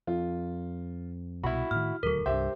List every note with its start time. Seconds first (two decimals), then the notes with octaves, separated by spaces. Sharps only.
0.07 F2 F4
1.44 C2 B2 E4 F#4 B5
1.71 A2 D#3 F6
2.03 D#1 D2 F#3 A4 A#4
2.26 C2 G2 G4 C5 E5